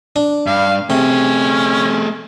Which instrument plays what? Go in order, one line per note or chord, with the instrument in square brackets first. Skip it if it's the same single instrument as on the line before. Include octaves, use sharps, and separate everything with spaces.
[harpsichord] D4
[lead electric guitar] G2 [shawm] F5
[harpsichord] C3 [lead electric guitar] A3 G#4 [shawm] C#4